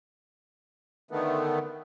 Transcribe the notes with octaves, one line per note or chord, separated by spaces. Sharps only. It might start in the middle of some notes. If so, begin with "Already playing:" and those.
D3 D#3 A3 B3